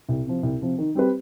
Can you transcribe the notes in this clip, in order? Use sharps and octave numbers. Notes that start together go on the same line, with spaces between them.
C2
C3 F3
C2
C3 F3
D#3
G3 C4 G4 B4